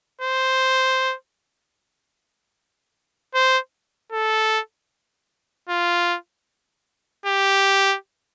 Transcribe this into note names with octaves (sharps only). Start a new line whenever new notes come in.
C5
C5
A4
F4
G4